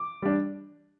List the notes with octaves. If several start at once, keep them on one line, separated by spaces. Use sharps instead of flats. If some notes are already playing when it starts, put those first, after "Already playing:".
Already playing: D6
G3 D4